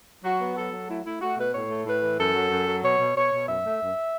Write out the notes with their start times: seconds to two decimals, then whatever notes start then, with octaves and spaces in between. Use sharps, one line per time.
0.23 F#3 F#4
0.40 B3
0.55 F#3 A4
0.71 F#3
0.88 A3 E4
1.04 A3 E4
1.20 A3 F#4
1.37 B2 B4
1.53 A2 C#5
1.69 A3
1.85 A2 B4
2.01 E3
2.17 F#2 A4
2.34 F#3
2.50 F#2
2.66 F#3
2.81 B2 C#5
2.98 B2
3.14 B2 C#5
3.30 B2
3.47 F#2 E5
3.63 A3
3.80 F#2